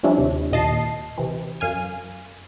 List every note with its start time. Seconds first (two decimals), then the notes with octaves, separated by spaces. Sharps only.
0.03 F3 G3 C#4 D4 E4
0.18 D#2 C3
0.51 D#2 A#2 D#5 A5 C7
1.18 C3 E3
1.60 F#2 F5 G#5 D#7